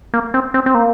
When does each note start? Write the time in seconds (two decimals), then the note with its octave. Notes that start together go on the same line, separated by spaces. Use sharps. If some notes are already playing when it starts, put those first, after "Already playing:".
0.14 A#3
0.34 C4
0.54 C4
0.66 C4
0.75 A#3